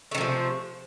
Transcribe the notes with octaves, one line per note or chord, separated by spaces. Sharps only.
C3 D#3 F3 A3